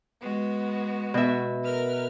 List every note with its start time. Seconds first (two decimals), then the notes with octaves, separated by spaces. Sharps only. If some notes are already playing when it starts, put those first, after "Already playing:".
0.22 G#3 B3 F#4
1.14 B2 E5
1.64 A#4 B4 F6